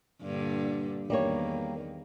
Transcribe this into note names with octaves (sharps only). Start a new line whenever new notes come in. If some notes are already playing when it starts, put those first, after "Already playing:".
G2 A#2 D3
E2 D#3 G3 A#3 C#5